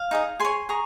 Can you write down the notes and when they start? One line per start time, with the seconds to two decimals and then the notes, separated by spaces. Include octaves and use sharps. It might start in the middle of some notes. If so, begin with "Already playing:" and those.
Already playing: F5
0.11 D#4 G#4 D#5
0.40 G#4 C#5 G#5 C6
0.69 G#4 A#5 C#6